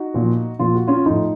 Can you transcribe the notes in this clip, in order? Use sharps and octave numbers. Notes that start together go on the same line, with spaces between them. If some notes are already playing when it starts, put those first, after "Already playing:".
Already playing: D#4 F#4
A#2 F3
A#2 F3 F4
F#4
C#4 F4
A2 F3 D#4